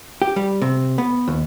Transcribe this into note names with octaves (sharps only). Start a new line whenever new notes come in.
G4
G3
C3
B3
D#2